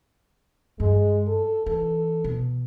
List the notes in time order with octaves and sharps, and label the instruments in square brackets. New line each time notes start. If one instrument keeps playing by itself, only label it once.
[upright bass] G2 [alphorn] G#3
[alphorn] A4
[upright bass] E3 [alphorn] A4
[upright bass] B2